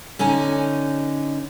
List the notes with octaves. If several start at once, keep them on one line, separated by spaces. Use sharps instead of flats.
D3 C#4 D#4 G#5